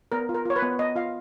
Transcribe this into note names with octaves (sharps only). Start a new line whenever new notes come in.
B3 A#4
F4
A#4
F4 C#5
B4
B3
B3 D#5
F4 F5